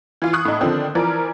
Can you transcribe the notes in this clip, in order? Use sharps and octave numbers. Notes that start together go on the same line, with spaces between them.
E3 F4
C#6 D#6 F#6
A2 D#4
D3 D#3 F3 C4 D4
E3 F3 A#4 D5